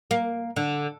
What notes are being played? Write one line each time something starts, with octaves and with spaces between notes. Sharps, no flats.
A#3
D3